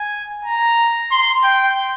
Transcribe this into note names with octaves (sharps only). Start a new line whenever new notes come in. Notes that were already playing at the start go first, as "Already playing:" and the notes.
Already playing: G#5
A#5
C6
G5